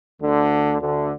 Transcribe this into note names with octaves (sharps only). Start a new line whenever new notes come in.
D2 D3
D2 D3